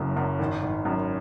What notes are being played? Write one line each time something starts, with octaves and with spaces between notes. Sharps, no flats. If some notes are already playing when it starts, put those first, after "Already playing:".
Already playing: F#1 F#2
F#2
G#1
G#1
F#2